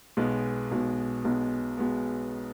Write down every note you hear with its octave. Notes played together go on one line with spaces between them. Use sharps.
B1 B2 G#3 B3
B1 B2 G#3 B3
B1 B2 G#3 B3
B2 G#3 B3